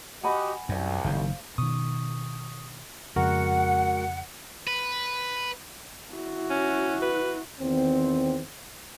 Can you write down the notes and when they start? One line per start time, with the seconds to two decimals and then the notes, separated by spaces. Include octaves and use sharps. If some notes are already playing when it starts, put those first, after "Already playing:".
0.23 F#4 G4 D#5 F#5 G#5 B5
0.69 C2 F#2
1.04 F#1 D#3 C5 F5
1.58 B2 D#3 C#6 D#6
3.16 F2 C#3 G#3 F#4 A#4 F#5
4.67 B4
6.14 E4 F#4
6.50 C#4
7.02 B4
7.61 E2 D#3 C4